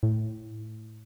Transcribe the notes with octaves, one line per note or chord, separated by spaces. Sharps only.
A2